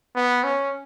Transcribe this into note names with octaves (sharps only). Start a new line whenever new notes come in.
B3
C#4